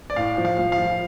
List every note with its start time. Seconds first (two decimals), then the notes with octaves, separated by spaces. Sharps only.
0.10 D5
0.16 A2 F5
0.38 F3
0.45 F5
0.58 F3
0.72 F5
0.78 F3